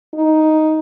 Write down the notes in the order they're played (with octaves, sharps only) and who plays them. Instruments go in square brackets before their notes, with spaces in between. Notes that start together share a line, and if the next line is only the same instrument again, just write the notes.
[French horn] D#4